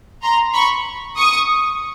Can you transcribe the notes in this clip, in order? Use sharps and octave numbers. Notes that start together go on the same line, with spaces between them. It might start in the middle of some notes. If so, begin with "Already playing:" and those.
A#5 C6
B5 C#6
C#6 D#6